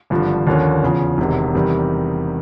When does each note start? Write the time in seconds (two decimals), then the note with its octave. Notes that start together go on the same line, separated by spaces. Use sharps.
0.10 G#1 G2 D3 F3
0.47 D#2 D3 F3 A#3 C#4
0.83 E2 C#3 F3
1.18 E1 E2 C3 D#3
1.55 E2 C3 D#3 G3